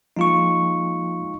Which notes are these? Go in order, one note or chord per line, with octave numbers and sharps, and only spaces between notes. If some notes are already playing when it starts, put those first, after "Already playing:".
F3 G#3 A#3 D#4 F4 C#6